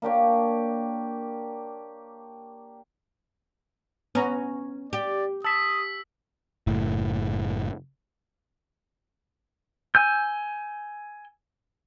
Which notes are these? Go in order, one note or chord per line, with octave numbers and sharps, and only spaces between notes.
A#3 D4 G4 C#5
B3 C#4 A#5
G4 D5
A5 D#6 E6 B6
F#1 A2
G#5 E6 G6